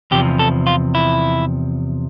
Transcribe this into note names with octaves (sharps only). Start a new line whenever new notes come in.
E2 C3 F3 G4
A4
F4
E4